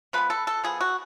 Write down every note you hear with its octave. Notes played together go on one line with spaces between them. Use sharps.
F3 G#3 B3 B4
A4
A4
F3 B3 G#4
F#4